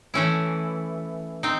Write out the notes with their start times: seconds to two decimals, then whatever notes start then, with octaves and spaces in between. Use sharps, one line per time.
0.14 E3 A3 C#4 E4
1.43 C4 D#4